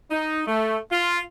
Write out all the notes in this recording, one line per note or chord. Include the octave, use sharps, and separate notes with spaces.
D#4
A3
F4